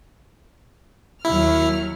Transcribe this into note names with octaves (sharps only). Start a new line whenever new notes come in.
D#2 F#3 E4 F6